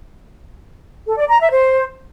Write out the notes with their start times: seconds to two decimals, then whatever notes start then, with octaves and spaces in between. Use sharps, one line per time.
1.06 A4
1.17 D5
1.29 A#5
1.40 E5
1.51 C5